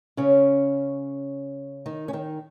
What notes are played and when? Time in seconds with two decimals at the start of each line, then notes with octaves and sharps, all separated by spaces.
0.17 C#3 C#4
1.86 D#3 D#4
2.08 C#4
2.13 D#3 D#4